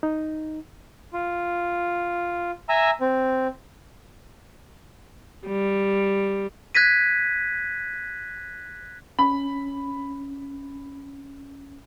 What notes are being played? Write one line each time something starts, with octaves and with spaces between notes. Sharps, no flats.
D#4
F4
E5 G#5 A#5 E6
C4
G3
F#6 G#6 A#6 B6 D#7
C#4 B5